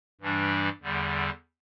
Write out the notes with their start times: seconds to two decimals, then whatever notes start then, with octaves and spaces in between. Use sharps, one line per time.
0.21 G2 E3 G3 D4
0.81 E2 D3 G3